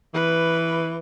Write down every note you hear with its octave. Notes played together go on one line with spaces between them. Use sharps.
E3 B4